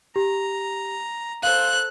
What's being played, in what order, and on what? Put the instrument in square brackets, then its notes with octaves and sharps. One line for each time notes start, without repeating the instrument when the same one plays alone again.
[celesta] G4 [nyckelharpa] A#5
[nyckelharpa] A4 C5 [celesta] F5 [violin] F#6